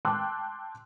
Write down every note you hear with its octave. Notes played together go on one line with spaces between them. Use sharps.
G5 A5 C6 D6 E6 F#6